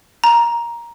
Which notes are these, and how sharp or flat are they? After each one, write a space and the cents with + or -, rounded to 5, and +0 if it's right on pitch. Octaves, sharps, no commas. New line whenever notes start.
A#5 +10